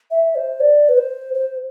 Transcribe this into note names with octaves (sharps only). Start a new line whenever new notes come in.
E5
C5
D5
B4
C5
C5